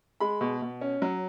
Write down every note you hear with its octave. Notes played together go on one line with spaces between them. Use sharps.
G#3 B5
B2
B2
C#4
F#3